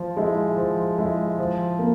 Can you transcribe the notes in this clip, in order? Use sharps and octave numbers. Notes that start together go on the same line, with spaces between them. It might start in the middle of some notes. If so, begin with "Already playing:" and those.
Already playing: F3
G#3 E4
F3
G#3 E4
F3
A#3